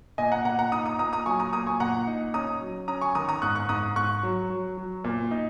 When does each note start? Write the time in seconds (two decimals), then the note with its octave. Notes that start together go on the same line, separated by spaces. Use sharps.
0.18 A#2 D#5 G#5
0.32 F#5 A#5
0.45 A#2 F#5 A#5
0.59 F#5 A#5
0.72 D#4 A#5 D#6
0.86 A#5 D#6
0.99 A#2 A#5 D#6
1.13 A#5 D#6
1.26 F#3 G#5 C#6
1.40 A#5 D#6
1.53 A#2 A#5 D#6
1.67 G#5 C#6
1.80 A#2 F#5 A#5
2.07 D#4
2.34 C#4 A#5 D#6
2.61 F#3
2.88 C#4 A#5 D#6
3.01 G#5 C#6
3.15 D#3 A#5 D#6
3.29 A#5 D#6
3.42 G#2 C#6 F#6
3.55 C#6 F#6
3.69 G#2 A#5 D#6
3.96 G#2 C#6 F#6
4.23 F#3
4.50 F#3
4.77 F#3
5.04 A#2
5.31 D#4